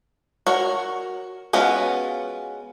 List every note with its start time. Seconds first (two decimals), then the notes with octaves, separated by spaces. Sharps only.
0.47 F#4 A#4 C#5
1.53 G#3 B3 C#4 F4 F#4